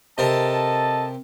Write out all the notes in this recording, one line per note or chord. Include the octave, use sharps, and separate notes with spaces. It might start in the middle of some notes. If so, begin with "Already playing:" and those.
C3 A4 A#4 D#5 A5